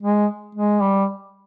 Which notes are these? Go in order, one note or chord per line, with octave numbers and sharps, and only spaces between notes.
G#3
G#3
G3